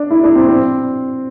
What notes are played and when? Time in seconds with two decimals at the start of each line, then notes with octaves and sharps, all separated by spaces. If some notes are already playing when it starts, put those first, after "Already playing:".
Already playing: D4
0.10 E4
0.23 D4
0.35 C4
0.48 C4